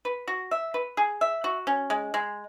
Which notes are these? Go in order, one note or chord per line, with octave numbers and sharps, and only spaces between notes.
B4
F#4
E5
B4
G#4
E5
F#4
C#4
G#3
G#3